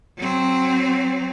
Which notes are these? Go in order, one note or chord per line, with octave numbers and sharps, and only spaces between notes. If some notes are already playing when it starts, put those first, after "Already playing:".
F#3 C4